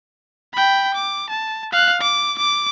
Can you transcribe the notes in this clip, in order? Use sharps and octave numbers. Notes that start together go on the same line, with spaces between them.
G5 B5
D6
A5
F5 F#6
D6
D6